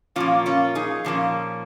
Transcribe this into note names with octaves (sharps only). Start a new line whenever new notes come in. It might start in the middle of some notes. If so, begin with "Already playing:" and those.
A#2 F3 A#3 C#4 F4
C#4 F4
D#4 G#4
A#2 F3 A#3 C#4